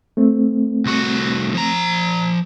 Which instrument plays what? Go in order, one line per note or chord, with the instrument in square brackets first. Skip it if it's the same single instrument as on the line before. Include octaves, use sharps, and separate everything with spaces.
[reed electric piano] A3 C4
[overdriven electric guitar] C2 F#4
F3 A#5